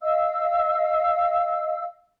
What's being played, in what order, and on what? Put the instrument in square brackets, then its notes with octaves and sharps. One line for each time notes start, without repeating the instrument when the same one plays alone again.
[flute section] D#5 F5 E6